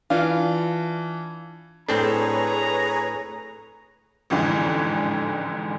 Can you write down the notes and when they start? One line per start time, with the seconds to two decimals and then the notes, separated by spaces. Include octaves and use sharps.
0.10 E3 D4 F4 F5
1.89 A2 C4 D4 G#4 A4 B4 C#5 A#5
4.30 A1 F2 G#2 D3 E3